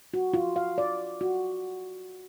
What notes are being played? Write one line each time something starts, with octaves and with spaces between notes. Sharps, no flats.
F#4
F4
F5
D5
F#4